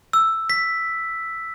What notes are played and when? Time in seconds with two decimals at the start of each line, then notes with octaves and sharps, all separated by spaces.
0.13 E6
0.50 B6